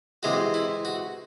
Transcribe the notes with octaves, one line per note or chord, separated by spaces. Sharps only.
C3 E3 G#3 F#4
E4
F#4